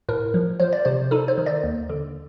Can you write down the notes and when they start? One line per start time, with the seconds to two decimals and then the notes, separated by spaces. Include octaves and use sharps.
0.09 A2 A#4
0.34 F3
0.60 F3 C5
0.73 D5
0.85 C3 C5
1.11 D#4 A4
1.28 C5
1.38 D#3
1.46 D5
1.63 D#2
1.90 D3